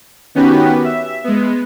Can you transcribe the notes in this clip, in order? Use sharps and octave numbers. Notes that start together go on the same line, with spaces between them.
D#3 B3 C#4 F#4 G4 B4
E5
G#3 B3